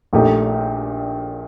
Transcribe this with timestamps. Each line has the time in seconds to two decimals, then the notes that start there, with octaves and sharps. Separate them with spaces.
0.13 A#1 A#2 A3 D#4 G4